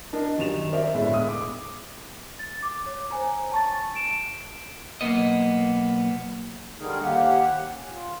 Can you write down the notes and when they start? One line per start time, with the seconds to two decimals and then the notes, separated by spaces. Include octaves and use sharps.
0.13 D4 A#4 D#5
0.37 F#2 D#3 G3 E7 F7
0.72 A#4 C5 D5 E5
0.94 G1 A2 G#3 E5
1.14 E1 D#6
1.29 D6
2.39 A6
2.63 D6
2.86 C#5
3.11 C5 C#5 G#5 A#5
3.51 A5 C#6 A6
3.95 D7 E7
5.01 B1 E2 A#3 B3 D#5
6.79 D3 D#3 G3 D#4 G#4 A#4
7.01 D#2 A#3 G4 F#5
7.72 C#4
7.89 F4